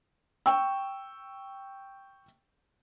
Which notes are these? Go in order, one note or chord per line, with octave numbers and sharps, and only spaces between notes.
G5 C#6 E6